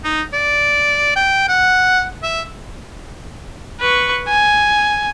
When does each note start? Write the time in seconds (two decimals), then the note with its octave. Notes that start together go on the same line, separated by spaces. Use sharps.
0.04 D#4
0.33 D5
1.16 G5
1.49 F#5
2.23 E5
3.81 B4 C#6
4.28 G#5